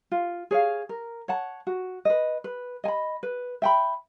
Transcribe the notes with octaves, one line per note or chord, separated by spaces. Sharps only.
F4
G#4 C#5 F5
A#4
C#5 F#5 A5
F#4
B4 D#5
B4
D#5 G#5 B5
B4
E5 G5 B5